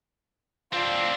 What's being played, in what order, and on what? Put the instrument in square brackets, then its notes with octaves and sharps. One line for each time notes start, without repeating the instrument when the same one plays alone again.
[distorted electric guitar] C4 D4 [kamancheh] F4 D5